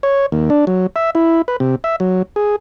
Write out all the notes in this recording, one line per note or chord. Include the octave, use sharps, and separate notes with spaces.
C#5
D#2
D4
F#3
E5
E4
B4
C3
E5
F#3
G#4